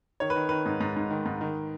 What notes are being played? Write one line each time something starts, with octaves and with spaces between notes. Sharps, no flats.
D#3 C#5
B4
D#3
D#3 B4
G#2
G#2
G#2
D#3
G#2
D#3